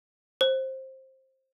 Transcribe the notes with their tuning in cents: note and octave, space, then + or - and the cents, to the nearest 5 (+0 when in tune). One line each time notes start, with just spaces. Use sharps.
C5 +15